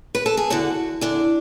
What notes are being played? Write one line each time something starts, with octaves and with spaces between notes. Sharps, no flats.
B4
A4
G#4
E2 D3 F#4
E2 D3 D4